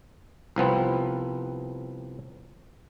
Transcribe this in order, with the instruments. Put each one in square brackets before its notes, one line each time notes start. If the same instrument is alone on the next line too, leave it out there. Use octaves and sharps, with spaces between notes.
[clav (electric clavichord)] C2 F3 B3 C4